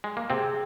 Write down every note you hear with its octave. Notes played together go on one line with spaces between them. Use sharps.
G#3
A#3
C3 C4 G#4